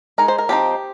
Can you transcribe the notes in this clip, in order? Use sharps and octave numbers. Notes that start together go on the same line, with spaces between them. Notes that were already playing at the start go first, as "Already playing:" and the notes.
G#3 D#4 A#4
C5
A#4
F3 C4 D#4 G4